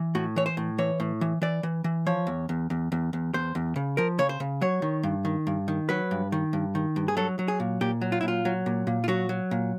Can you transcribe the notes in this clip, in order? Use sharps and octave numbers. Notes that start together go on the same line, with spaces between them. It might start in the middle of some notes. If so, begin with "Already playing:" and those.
Already playing: E3
A2 F#4
E3 C#5
C5
A2
E3 C#5
A2
E3
E3 D5
E3
E3
F3 C#5
E2
E2
E2
E2
E2
E2 C5
E2
C#3
F3 A#4
C#3 C#5
C5
C#3
F#3 C#5
D#3
G2
D#3
G2
D#3
F#3 B4
G2
D#3
G2
D#3
G2
G#4
F#3 A4
F#3
G#4
A#2
A#2 G4
F#3
F4
A#2 E4
F4
F#3
A#2
A#2
F4
F#3 F#4
F#3
A#2